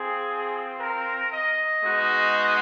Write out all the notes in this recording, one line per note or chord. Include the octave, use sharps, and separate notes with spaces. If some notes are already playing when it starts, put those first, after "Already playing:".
Already playing: C4 F4 G#4
A#4
D#5
G#3 B3 D#4 F#4